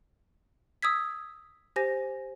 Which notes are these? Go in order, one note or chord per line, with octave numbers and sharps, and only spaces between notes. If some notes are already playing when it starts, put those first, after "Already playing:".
D#6 E6 G#6 B6
G4 C5 G#5 A#6